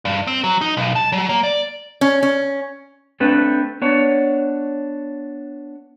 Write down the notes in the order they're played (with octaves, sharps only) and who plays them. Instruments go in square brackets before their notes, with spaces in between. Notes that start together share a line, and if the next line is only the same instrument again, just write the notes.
[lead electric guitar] G2
C4
F#3
D#4
B1
A5
F#3
A#3
D5
[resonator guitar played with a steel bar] C#4
C#4
[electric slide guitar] A3 C4 D4 B4
B3 D4 C#5